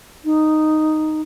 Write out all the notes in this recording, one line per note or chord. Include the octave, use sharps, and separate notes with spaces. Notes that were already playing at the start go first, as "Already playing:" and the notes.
D#4